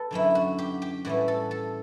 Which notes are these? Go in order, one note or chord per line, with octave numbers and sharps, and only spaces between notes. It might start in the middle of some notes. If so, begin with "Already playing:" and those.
Already playing: A4 B4
F#2 D3 F#3 C#4 E4
F#4
G4
G4
A2 E3 G3 C#4 F#4
A4
A4